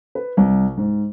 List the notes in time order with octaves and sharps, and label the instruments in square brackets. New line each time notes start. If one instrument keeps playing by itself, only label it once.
[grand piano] B4
C2
G#2